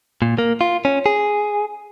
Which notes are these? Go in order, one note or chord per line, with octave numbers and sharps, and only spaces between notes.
A#2
A#3
F4
C#4
G#4